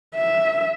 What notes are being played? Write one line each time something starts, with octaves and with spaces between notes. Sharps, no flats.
E5